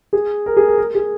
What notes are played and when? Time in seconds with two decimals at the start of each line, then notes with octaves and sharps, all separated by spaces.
0.13 G#4
0.46 A#4
0.57 G#4
0.68 A#4
0.78 A#4
0.95 G#4